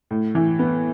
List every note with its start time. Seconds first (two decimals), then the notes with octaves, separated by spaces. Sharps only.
0.11 A2
0.35 E3
0.59 B3